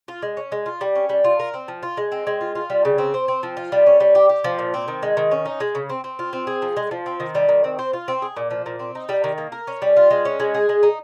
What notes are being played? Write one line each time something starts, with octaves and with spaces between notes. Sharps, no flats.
F4
G#3
C#4
G#3
F4
G3
C#4
G3
F4
A#4
C4
F3
F4
G#3
C4
G#3
F4
F4
G3
C#3
C4
C5
C4
F3
F4
G3
C#4
G3
G4
G4
F3
A#2
C4
D#3
G#3
D#3
C#4
D#4
G#3
C#3
C4
C4
F4
C4
G#4
F3
G#3
F3
C4
D#3
G3
D#3
C4
C5
F4
C4
G#4
A#2
F3
A#2
C4
D#4
G3
D#3
A#3
A#4
C#4
G3
F4
G#3
C#4
G#3
G#4
G#3
D#4